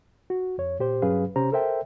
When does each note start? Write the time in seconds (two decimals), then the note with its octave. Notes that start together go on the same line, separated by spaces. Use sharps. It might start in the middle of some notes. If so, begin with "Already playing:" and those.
0.30 F#4
0.58 F2 C#5
0.80 A#2 G4 C5
1.02 G2 F#3 C#4 G#4 B4 F5
1.36 C3 C#4 G4 C5 A#5
1.52 A4 A#4 C5 E5 G5